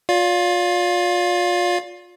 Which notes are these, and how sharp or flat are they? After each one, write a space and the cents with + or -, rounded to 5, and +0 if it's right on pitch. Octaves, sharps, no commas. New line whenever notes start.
F4 +30 D5 -25 F5 +15